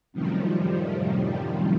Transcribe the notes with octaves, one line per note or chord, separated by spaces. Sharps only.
F#2 A2 C3 D#3 F3 G3